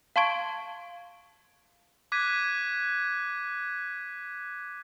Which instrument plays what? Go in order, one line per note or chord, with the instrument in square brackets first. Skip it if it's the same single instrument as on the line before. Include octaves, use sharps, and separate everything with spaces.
[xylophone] F5 A5 C6 C#6 G#6 D7
[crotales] D6 F#6 G#6 B6 D#7